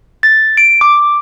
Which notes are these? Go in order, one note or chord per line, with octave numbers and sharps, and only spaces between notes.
A6
D7
D6